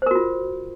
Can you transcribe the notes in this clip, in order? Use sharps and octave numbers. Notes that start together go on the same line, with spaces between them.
F4 F#4 A#4 C5